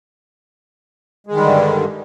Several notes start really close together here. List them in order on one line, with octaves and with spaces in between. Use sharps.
G#3 D#3 G3 D3 G2